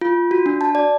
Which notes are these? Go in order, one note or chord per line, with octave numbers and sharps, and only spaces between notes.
F4
F#4
D4
A5
D5